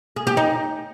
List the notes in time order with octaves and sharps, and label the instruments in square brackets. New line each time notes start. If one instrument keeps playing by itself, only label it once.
[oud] G#4
G4
D#4